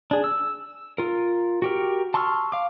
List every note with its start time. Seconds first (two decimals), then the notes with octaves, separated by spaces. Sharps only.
0.11 D4 G#4
0.24 E6
0.98 F4 A#4
1.62 F#4 G4 A#4
2.14 A5 C6 C#6 E6 F6
2.52 F5 D6